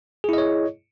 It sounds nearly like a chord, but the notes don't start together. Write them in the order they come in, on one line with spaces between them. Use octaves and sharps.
G#4 E4 D#5 C#5